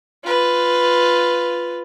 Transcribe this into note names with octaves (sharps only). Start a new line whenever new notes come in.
F4 B4